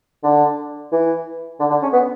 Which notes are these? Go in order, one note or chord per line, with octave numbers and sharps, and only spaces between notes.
D3
E3
D3
D3
C#4
B3